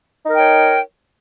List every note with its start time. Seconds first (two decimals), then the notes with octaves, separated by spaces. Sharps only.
0.25 D#4
0.29 A#4
0.34 G5
0.39 C#5